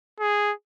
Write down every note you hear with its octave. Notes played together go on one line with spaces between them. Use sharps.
G#4